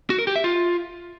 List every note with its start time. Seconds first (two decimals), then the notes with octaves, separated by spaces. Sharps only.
0.10 F#4
0.19 A#4
0.27 G4
0.36 E5
0.44 F4